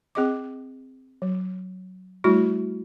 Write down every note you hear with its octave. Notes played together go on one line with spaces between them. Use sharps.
C4 G#4 D#5 D6
F#3
G3 A3 E4 F#4